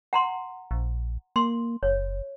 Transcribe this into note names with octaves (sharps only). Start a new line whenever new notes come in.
F#5 A#5 C6
A#1
A#3 C6
F#1 C#5